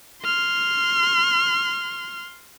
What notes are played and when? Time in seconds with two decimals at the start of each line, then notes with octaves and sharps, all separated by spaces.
0.23 C6 F6